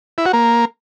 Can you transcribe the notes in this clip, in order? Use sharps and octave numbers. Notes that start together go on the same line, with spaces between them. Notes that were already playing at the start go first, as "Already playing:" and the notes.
E4
F#4
A#3